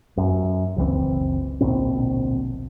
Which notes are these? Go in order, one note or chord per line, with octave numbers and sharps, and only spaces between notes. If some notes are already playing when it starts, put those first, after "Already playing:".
F#2
F#1 C#2 E3 C4
D1 A#1 B2 C4